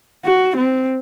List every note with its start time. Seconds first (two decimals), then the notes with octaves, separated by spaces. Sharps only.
0.25 F#4
0.57 C4